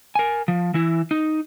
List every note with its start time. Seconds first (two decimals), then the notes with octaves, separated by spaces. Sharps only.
0.15 A#4 G#5
0.48 F3
0.74 E3 E4
1.11 D#4